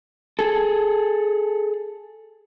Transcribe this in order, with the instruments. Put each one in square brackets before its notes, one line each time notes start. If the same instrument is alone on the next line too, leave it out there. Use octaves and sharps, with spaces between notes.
[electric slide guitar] G#4 A4